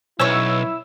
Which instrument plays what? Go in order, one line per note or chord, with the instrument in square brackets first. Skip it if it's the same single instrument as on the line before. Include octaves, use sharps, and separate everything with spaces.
[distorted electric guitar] B1 [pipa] C#4 B4 C#5 [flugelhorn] E4 [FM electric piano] E6